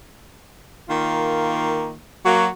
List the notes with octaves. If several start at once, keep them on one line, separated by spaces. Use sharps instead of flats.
D#3 A#3 F4
F#3 A#3 F#4